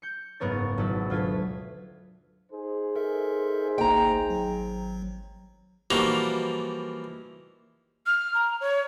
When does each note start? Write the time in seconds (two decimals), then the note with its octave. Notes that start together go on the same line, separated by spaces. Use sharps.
0.02 G6 C#7
0.40 F#1 G#2 B3 A#4 C#5 A6
0.78 G#1 B2 F#3 E4 A6
1.10 D2 F4 G#6 B6
2.51 D#4 G#4 C5
2.96 A4 A#4 E5
3.78 G#1 C#2 A#3 G5 A#5
4.30 G#1 F#3
5.91 E3 F3 G3 A#3 D#4 F#4
8.06 F6
8.35 A#5
8.61 C#5